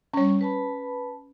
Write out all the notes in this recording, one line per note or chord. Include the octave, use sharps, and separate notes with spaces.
G3 C#4 C#5 C#6
B4 A5 B5